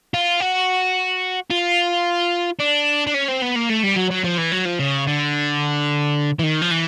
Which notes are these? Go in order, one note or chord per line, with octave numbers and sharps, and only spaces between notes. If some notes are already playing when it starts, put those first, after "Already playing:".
F4
F#4
F4
D4
D4
C#4
C4
B3
A#3
A3
G3
F#3
F#3
F3
E3
F#3
F3
C#3
D3
E3
D#3
F3
E3